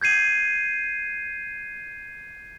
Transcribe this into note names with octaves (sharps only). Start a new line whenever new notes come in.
G6 G#6 C7 D#7